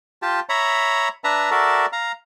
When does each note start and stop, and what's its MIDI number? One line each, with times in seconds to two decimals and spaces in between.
0.22 0.40 65
0.22 0.40 67
0.22 0.40 81
0.49 1.08 73
0.49 1.08 76
0.49 1.08 82
0.49 1.08 83
1.24 1.50 62
1.24 1.50 71
1.24 1.50 76
1.24 1.50 81
1.24 1.50 82
1.51 1.86 66
1.51 1.86 69
1.51 1.86 70
1.51 1.86 74
1.51 1.86 76
1.93 2.12 77
1.93 2.12 82